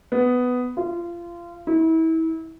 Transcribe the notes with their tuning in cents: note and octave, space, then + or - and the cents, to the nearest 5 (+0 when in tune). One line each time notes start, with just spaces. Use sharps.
B3 +10
F4 -25
E4 -30